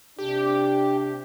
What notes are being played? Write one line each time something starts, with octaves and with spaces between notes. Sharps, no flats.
C3 D4 G4